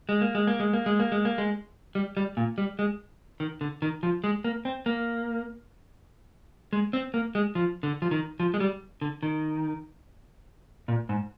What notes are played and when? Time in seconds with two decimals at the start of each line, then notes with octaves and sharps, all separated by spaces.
0.09 G#3
0.21 A#3
0.35 G#3
0.47 A#3
0.60 G#3
0.73 A#3
0.86 G#3
1.00 A#3
1.12 G#3
1.25 A#3
1.38 G#3
1.95 G3
2.17 G3
2.37 A#2
2.58 G3
2.79 G#3
3.40 D#3
3.61 D3
3.82 D#3
4.03 F3
4.24 G#3
4.44 A#3
4.65 C4
4.86 A#3
6.73 G#3
6.93 C4
7.14 A#3
7.35 G#3
7.55 F3
7.83 D3
8.02 F3
8.11 D#3
8.40 F3
8.54 G#3
8.60 G3
9.01 D3
9.23 D#3
10.88 A#2
11.09 G#2